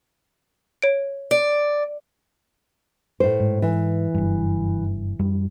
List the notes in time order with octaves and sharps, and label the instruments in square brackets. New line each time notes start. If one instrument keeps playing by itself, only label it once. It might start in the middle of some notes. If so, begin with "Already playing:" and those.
[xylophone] C#5 D7
[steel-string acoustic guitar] D5
[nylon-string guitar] A2 C5
[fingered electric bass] G#2
[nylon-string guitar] E3
[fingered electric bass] F#1 G2
F#2 G3